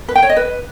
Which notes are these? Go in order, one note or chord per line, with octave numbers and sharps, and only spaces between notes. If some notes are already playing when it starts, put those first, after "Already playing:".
B4
G5
C#5
D#5
B4